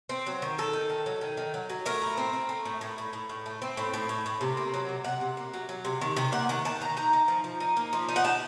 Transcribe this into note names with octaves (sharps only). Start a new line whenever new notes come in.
C4
F#3
D#3
D#3 A4
D#3
D#3
F#3
D#3
D#3
F#3
F#3
A3 A#4
A2
C4
C4
A3
A2
A2
A2
A2
A2
A3
C4
A2
A2
A2
A2
C3
A#3
F#3
C3
C3 F#5
C3
A#3
F#3
F#3
C3
D#3
C3
A#3 F#5
D#3 F#5
D#3 A5
D#3 A#5
D#4 A#5
D#4
F3
F3
D#4
A#3
F3
D#4
F#5
D#4 A5